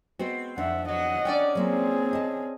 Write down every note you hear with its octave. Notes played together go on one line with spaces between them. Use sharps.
G#3 B3 C4 F#4
F2 D4 E5 F#5
F#3 D#5 F#5
C#4 D4 D5 G5
F#3 A#3 C4 F4 G#4
D#5 A5